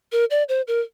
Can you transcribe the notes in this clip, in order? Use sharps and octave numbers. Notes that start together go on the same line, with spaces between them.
A#4
D5
C5
A#4